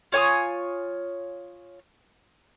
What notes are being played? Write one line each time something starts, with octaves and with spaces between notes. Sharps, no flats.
F4 C#5 G#5 D#6